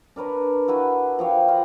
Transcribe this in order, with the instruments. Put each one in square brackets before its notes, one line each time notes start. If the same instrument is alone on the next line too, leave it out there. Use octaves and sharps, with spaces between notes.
[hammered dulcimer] D4 A#4 B4 C#5
E4 F#4 B4
F3 G4 C#5
F4 F#4 F#5 G5